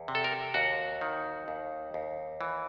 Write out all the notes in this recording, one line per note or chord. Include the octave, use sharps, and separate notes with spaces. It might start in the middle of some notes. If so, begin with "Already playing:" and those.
Already playing: E2
C3
A4
A#4
D#2 F#4
D#3
D#2
D#2
E3